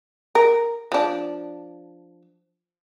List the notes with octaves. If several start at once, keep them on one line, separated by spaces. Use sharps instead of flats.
A#4
F3 D4